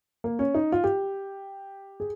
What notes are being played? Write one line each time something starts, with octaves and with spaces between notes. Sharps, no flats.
A#3
C#4
D#4
F4
G4
G#4